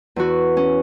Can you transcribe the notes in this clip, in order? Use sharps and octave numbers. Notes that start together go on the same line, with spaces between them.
E2 E3 F#4
C#4